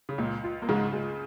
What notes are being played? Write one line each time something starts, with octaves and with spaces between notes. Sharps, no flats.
C#3
C#2 A#2
F4
A#3
G#2 C#3 G#3
G#3